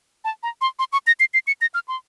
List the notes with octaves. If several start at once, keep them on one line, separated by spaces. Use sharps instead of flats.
A5
A#5
C6
C6
C#6
A#6
C7
C7
C#7
A#6
F6
C6